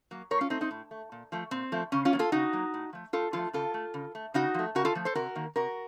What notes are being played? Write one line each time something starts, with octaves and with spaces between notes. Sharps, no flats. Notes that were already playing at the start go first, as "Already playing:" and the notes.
F#3 A#3
A2 A#4 C#5
C#4 F4
A3 C4 D#4
C4 D#4
A2
A3
A#2
F3 A3
A#2 C4
F3 A3
C#3 C#4
C#4 F4
F#3 A#3
F4 A4
C#3 D#4 F#4
F#3 A#3
A2
F3 A3
A2 F4 A4
F3 A3 F4 A4
C#3 F4 A4
A3
C#3
A3
C#3 D#4 F#4
F3 A3
C#3 F#4 A#4
F4 A4
F3 A3
A4 C5
C3 F#4 A#4
D#3 A#3
C3 F#4 A#4